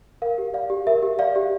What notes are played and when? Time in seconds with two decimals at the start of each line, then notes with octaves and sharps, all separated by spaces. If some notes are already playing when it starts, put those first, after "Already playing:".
0.22 A#4 F5
0.38 G4
0.54 D5 F5
0.70 G4
0.87 A#4 E5
1.03 G4
1.19 D5 F5
1.36 G4